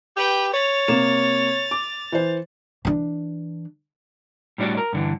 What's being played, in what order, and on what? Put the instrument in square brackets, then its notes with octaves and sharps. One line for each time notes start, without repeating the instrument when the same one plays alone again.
[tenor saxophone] G4 [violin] B4 G5
[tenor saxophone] C#5 [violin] A6 F7
[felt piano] C3 A#3 E7
D6
E3 C5
[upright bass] E3 D4
[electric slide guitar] A2 G3 D4 F#4 D5
A#4
G2 D3 E3